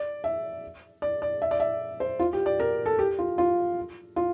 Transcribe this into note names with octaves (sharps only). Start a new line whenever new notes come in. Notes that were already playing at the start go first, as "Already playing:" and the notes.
Already playing: D5
E5
D5
D5
E5
D5
E5
C5
F4
G4
D5
A#4
A4
G4
F4
F4
F4